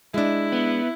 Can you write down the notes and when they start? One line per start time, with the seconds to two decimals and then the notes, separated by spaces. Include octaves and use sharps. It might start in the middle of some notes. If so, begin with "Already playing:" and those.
0.14 G#3 D4 E4
0.52 B3